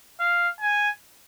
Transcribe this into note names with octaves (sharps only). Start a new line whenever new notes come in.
F5
G#5